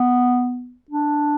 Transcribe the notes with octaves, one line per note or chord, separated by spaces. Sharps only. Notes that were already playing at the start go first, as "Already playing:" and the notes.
Already playing: B3
D4